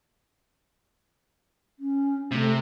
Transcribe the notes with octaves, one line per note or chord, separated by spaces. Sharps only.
C#4
C3 A3